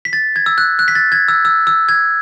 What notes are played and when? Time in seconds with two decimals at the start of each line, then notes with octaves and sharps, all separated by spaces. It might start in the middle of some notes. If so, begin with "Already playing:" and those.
0.05 B6
0.13 A6
0.36 G#6
0.46 E6
0.58 F#6
0.79 F#6
0.88 B6
0.95 A6
1.12 G#6
1.28 E6
1.45 E6
1.67 E6
1.89 G#6